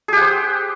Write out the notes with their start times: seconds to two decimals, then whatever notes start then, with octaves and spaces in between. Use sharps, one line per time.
0.08 G#4
0.13 G4
0.17 F#5
0.21 C5